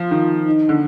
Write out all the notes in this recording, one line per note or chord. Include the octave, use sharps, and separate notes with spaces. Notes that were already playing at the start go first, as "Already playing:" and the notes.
Already playing: F3 F4
D#3
D#4
D3